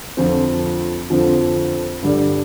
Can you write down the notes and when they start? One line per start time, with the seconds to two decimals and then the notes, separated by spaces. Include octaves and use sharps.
0.17 F2 D3 F3 C4
1.10 F2 D3 F3 C4
2.02 G2 D3 G3